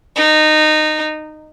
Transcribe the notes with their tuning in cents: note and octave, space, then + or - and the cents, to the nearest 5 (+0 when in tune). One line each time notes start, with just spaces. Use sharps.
D#4 -15